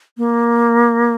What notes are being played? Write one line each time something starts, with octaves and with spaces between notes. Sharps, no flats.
A#3